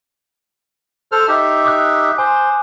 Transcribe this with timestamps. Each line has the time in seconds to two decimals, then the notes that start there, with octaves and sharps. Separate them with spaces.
1.12 A4 C5 F6
1.28 D#4 G4 E5
1.65 D6 D#6 F#6
2.18 C5 G#5